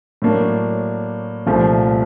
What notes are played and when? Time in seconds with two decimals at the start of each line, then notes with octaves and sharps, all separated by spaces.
0.22 A2 F#3 A#3 D4
1.46 C2 A#2 F3 A3